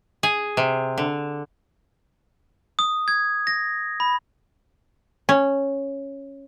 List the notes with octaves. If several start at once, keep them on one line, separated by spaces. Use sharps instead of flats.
G#4
C3
D3
D#6
G#6
A#6
B5
C#4